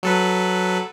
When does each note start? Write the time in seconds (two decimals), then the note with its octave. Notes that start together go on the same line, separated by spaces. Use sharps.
0.03 F#3 A4 B4